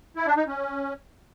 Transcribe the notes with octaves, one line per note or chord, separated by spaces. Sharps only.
E4
D4
D#4
C#4